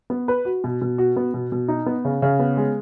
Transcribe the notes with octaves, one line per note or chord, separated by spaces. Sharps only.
B3
B4
F#4
B2
B2
F#4
B3
B2
B2
D#4
B3
C#3
C#3
B3
G#3